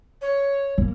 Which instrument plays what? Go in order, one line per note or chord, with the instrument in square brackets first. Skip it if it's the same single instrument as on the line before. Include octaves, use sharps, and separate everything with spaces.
[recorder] C#5
[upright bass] A#3